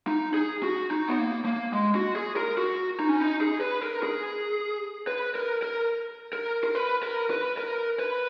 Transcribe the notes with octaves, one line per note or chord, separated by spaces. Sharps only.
D#4
G#4
F#4
D#4
B3
A#3
A#3
G#3
F#4
G#4
A#4
F#4
D#4
C#4
D#4
G#4
B4
A#4
G#4
B4
A#4
A#4
A#4
A#4
B4
A#4
B4
A#4
B4